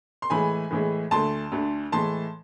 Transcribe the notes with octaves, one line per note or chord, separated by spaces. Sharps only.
C6
A2 E3 G#3 G#5 B5
A2 E3 G#3
D2 D3 A3 A5 C6
D2 D3 A3
A2 E3 G#3 A5 C6